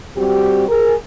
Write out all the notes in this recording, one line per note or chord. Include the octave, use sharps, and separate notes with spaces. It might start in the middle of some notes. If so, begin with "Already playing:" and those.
G3 C4 F#4 G4
G#4 A#4